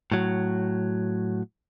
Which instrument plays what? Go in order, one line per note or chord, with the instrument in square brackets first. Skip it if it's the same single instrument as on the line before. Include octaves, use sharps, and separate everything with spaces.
[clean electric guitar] A2 F#3